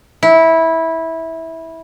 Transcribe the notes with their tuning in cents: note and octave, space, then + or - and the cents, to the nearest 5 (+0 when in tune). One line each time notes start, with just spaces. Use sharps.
E4 -15